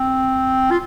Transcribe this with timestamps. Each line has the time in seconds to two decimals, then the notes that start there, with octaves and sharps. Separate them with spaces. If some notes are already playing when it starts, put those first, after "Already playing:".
Already playing: C4
0.71 F4